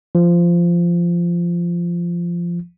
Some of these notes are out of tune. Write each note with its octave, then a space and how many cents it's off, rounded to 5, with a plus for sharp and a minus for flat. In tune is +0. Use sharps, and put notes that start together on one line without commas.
F3 -15